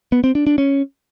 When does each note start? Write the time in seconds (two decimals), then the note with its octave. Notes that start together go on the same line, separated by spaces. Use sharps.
0.12 B3
0.24 C4
0.35 D4
0.47 D4
0.58 C#4